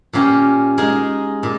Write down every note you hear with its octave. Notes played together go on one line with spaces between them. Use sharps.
A#2 A#3 C#4 G4
G#3 D#4 A#4 D#5
A#2